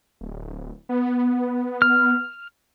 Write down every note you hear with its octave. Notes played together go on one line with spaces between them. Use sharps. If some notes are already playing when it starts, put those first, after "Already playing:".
D1
B3
F6